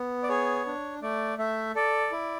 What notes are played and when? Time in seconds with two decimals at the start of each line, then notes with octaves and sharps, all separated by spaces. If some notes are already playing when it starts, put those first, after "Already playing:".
Already playing: B3
0.23 D5
0.29 G#4 C#5
0.66 D4
1.02 A3 D5
1.38 A3 E5
1.75 A4 D5
2.12 E4